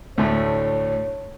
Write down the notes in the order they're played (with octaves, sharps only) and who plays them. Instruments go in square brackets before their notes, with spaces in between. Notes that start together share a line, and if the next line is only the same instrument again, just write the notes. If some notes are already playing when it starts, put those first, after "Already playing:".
[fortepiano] D2 A2 A3 [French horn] C#5